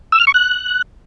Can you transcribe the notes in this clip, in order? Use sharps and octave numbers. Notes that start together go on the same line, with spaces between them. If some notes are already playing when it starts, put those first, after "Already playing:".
E6
F6
C#6
F#6